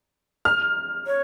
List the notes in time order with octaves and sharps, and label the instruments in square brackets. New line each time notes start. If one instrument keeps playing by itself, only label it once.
[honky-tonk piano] F6
[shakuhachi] C#5